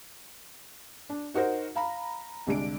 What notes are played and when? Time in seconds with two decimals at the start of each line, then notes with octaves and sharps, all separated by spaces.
1.09 D4
1.34 D#4 F#4 A#4 C5
1.76 F5 A#5 B5
2.47 C2 D3 G#3 D4 D7